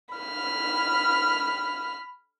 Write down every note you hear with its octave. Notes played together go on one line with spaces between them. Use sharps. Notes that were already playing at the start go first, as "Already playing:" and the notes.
B5 F6